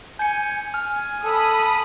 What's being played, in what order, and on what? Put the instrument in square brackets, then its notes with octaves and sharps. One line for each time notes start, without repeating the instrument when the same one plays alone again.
[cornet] G#5 [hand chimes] G6 C#7
[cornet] G#5 [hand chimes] F6
[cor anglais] A4 [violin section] B5 D#6